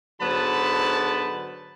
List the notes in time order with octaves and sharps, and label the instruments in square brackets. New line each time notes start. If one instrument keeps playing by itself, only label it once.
[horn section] G#2 D3 F#3 B3 A5 B5